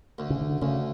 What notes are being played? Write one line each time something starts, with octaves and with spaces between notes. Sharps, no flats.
D2
C#3
D3
D2 C#3